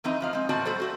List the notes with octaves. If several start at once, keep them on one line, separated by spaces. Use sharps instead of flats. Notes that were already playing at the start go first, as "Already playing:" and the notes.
F#2 E3 C4 D#4 D#5 A#5
F2 F3 F5
G#3 C4
E2 A#2 C4 F#4 D5 A5
G3 F#4 A4 C5
A3 F#4 C5